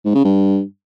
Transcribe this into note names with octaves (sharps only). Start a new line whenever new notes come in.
G#2
C#3
G2